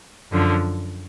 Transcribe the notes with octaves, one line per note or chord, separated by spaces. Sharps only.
F#2 D3 F3